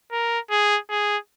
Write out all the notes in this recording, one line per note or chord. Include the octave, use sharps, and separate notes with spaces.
A#4
G#4
G#4